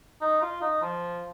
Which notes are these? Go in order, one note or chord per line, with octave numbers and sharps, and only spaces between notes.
D#4
F4
D#4
F3